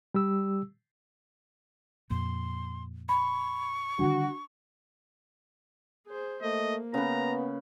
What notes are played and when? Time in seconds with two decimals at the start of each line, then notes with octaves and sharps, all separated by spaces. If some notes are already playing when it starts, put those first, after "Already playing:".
0.14 G3 G4 E6
2.10 F2 A#2 C6
3.09 B5 C#6
3.99 D3 D#3 G3 D4 F#4
6.07 G#4 C5
6.42 A3 A#3 D#5
6.94 C#3 B3 B4 A#5